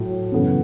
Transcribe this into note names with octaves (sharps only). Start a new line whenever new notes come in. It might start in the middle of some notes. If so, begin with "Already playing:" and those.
Already playing: A2 F#3 A3
F#2 C#3 E3 B3 A4